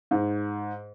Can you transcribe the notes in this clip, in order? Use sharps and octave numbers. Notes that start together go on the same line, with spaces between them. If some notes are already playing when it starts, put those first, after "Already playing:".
G#2